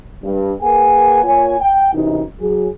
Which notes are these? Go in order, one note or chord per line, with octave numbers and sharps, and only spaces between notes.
G2
A#3 G#4 A#4 B4 F#5 G#5
A#2 F4 C#5 G#5
G5
F#2 C3 E3 D#4
F#3 G#4